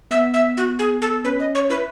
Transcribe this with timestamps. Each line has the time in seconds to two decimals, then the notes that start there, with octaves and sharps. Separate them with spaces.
0.11 B3 E5
0.34 E5
0.57 F#4
0.79 G#4
1.02 A4
1.24 C#4 B4
1.40 D#5
1.55 C#5
1.70 E4 B4